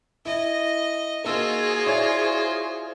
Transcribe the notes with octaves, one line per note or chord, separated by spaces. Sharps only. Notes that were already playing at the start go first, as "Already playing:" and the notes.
E4 D#5
A#3 D#4 F4 F#4 G#4 C5 E6
E4 C#5 D5